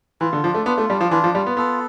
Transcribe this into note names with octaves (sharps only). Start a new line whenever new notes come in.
E3 F4
D3
F3 D4
A3
B3 F4
A3
G3 D4
F3
E3 F4
F3
G3 F4
B3
B3 A4